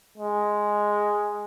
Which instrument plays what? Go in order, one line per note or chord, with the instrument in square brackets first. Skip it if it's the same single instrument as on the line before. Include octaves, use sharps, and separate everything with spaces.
[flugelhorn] G#3